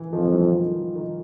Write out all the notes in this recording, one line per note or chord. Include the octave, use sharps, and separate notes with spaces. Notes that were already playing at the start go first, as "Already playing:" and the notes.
Already playing: E3
F2 D#3 F3
G3
E3 F#3
D#3 F3
D#3